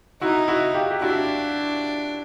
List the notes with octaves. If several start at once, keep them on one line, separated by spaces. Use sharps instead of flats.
D#4 E4 F#4
E4 F#4
F4 G4
G4
D4 E4 F#4